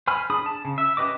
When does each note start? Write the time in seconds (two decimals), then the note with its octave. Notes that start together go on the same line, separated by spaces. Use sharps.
0.07 C5 G#5 B5 F6
0.30 D4 G#4 B5 D#6
0.46 A5
0.65 C#3
0.78 E5
0.97 C#4 G4 B4 D#5 D6